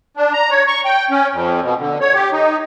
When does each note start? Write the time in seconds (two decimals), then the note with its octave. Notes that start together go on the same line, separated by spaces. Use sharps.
0.17 D4
0.33 A#5
0.51 C#5
0.68 C#6
0.85 G5
1.11 C#4
1.33 F2
1.63 B2
1.80 D3
2.01 C#5
2.15 G4
2.32 D#4